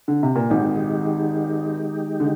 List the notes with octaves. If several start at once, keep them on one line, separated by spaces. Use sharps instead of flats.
D3
C3
A#2
G#1 G#2 D#3 G#3 D#4 G4
D3